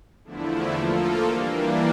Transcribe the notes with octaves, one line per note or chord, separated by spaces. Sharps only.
E2 D3 F3 A3 E4
F3 A#3 F4 A4
E3 G3 A#3 D4